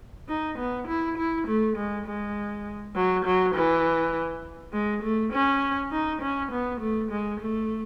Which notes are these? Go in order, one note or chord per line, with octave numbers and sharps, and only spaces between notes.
D#4
B3
E4
E4
A3
G#3
G#3
F#3
F#3
E3
G#3
A3
C#4
D#4
C#4
B3
A3
G#3
A3